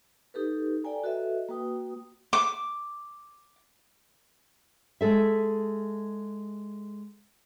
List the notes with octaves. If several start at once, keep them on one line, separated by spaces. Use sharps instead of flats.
D#4 G4 A4 B4
A4 D5 G5 G#5 A#5
F#4 A4 B4 D#5 E5
A#3 F#4 B4 G5 D#6
D6
G#3 G#4 A4 E5